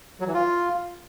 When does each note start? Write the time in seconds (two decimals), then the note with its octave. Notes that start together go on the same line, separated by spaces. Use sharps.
0.20 F#3
0.27 E3
0.34 F4